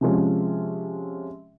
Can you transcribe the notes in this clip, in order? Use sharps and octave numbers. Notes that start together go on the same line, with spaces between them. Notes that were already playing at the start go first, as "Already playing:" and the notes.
C3 F3 G#3 C#4